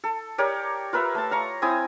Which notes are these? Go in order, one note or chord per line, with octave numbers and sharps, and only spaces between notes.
A4
G4 A#4 C#5 D5
F4 A#4 B4 E5
A3 A5
F5 A#5 C#6
C4 E4 G#5 D#6